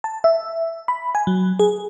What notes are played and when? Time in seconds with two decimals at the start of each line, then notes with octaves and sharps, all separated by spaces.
0.04 A5
0.24 E5
0.88 B5
1.15 G#5
1.27 F#3
1.59 G#4